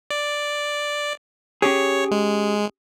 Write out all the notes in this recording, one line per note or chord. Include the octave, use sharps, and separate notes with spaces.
D5
C#4 G4 G#4 C#5
G#3